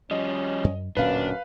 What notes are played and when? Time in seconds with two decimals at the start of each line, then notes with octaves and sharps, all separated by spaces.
0.11 F3 G3 C#4 D#5
0.64 F#2
0.97 D1 F#2 A#2 C#4 D4 B4 F5